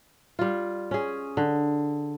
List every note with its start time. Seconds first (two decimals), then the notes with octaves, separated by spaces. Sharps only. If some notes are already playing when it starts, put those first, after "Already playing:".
0.39 G3 F4
0.91 C#4 G#4
1.37 D3